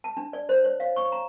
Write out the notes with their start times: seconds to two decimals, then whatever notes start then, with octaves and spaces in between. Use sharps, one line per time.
0.04 A5
0.17 D4
0.33 D5
0.49 C5
0.64 C#5
0.80 F5
0.96 C#6
1.12 A#5